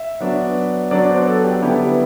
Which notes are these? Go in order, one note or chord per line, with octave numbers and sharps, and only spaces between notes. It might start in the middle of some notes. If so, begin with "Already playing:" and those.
Already playing: E5
F#3 B3 D4
F#3 B3 D4 D5
C5
A4
G4
D3 G3 B3 E4 G4